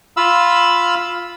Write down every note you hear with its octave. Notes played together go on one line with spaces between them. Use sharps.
F4 F5 B5 E6